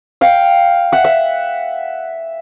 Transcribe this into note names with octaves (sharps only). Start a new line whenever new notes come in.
F5 G5
E5 F#5
E5 F#5